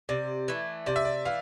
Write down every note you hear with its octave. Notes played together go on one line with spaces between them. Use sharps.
C3 D5
E3 A3
C3 D5
E5
D5
E3 F5